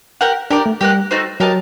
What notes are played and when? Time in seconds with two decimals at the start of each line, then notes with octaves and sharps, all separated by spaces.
0.21 G4 A#4 F#5
0.51 D4 G4 A#4 D5
0.66 A3
0.81 G3 G4 A#4 F#5
1.11 A3 D#4 F#4 C5
1.40 F#3 G4 A#4 D#5 A5